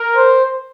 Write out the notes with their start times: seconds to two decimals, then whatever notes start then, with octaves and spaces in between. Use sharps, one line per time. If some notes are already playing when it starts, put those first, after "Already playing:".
Already playing: A#4
0.16 C5